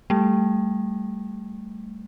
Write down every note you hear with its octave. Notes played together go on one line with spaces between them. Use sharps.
G3 A3